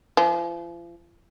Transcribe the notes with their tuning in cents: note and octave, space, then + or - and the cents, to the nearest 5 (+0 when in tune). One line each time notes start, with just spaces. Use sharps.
F3 -40